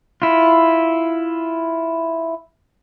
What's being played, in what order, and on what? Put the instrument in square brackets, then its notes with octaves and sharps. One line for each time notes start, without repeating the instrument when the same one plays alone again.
[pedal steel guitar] E4 F4